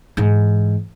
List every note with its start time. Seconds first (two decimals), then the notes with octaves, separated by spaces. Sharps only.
0.17 G#2 E3